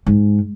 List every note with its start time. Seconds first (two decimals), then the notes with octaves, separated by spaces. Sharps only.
0.06 G#2